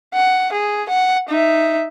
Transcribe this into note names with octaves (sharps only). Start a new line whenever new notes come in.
F#5
G#4
F#5
D#4 E5